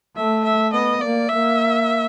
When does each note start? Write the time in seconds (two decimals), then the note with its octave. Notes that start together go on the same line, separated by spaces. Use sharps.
0.17 A3 E5
0.45 E5
0.73 B3 D#5
1.01 A#3 D5
1.29 A#3 E5